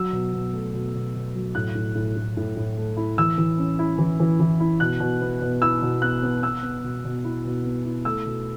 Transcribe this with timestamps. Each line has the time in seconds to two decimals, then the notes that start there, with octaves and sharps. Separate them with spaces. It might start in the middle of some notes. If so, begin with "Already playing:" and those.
Already playing: F#3 E6
0.12 B2
0.33 B2
0.53 A3
0.74 B2
0.94 B2
1.15 B2
1.35 F#3
1.55 A2 F#6
1.75 A2
1.95 A2
2.16 A2
2.37 A2
2.57 A2
2.77 A3
2.97 E4
3.18 E3 E6
3.38 E3
3.58 C#4
3.79 E4
3.98 E3
4.20 E3
4.40 E3
4.60 E4
4.80 B2 F#6
5.00 B2
5.21 B3
5.41 B2
5.61 E4 E6
5.82 B2
6.02 B3 F#6
6.23 B3
6.43 B3 E6
6.62 B3
6.84 B2
7.04 B2
7.24 E4
7.45 B2
7.65 B3
7.85 E4
8.05 A3 E6
8.26 B2